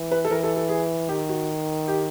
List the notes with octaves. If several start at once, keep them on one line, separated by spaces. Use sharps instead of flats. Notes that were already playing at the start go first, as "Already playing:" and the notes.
Already playing: E3
B4
A4
E3 A#4
A4
A4
G#4
D#3 G4
F#4
G4